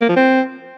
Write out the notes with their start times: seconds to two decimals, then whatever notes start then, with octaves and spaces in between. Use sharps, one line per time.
0.01 A#3
0.09 F3
0.17 C4